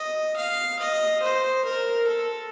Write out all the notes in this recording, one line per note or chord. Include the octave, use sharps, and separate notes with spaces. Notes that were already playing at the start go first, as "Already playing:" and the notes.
Already playing: D#5
F5
D#5
C5
A#4
A4